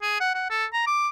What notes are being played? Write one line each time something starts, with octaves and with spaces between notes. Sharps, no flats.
G#4
F#5
F#5
A4
A#5
D6